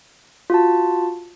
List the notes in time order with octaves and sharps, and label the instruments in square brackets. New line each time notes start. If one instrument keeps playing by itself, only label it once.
[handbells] F4 F#4 A5